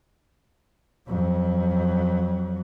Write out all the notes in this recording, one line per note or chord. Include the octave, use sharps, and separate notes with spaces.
F2 F#3